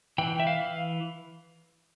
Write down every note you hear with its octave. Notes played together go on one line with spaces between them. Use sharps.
E3 G5
E5
F5
E3